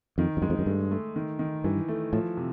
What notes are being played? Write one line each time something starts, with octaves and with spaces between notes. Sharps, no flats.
F2 D#3
F2
F#2 G#3
F2
F#2
G2 A3
A3
D#3
D#3
G2 E3
A3
A2 F3
C3